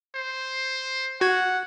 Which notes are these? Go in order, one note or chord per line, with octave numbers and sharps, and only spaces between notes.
C5
F#4 F#5 G#6